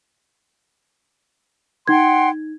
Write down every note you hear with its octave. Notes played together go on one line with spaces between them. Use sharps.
D#4 F#5 G5 C6 G#6